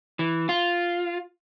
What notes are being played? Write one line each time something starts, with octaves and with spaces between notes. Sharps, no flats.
E3
F4